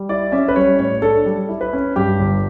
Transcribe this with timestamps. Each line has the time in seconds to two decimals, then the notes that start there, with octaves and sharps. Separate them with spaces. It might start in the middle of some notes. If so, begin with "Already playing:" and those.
Already playing: G3
0.09 E4 D5
0.32 C#4 E5
0.48 B4
0.56 G3 C#5
0.79 A2 C#5
1.02 D4 A4
1.26 G3
1.49 E4
1.61 B4
1.73 C#4
1.96 G2 G4
2.19 G1